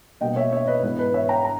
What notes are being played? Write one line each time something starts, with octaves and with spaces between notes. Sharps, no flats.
B2 G3 A#3 D#5 G5
C#5 E5
C#5 E5
B4 D#5
G#2 E3 G#3 B3 B4
B4
C#5 E5
G5 A#5
A#5